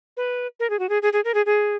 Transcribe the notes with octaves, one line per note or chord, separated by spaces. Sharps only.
B4
A#4
G#4
F#4
G#4
G#4
G#4
A#4
G#4
G#4